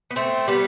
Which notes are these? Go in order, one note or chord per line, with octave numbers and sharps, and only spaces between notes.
B3
A3 C4
G3 B3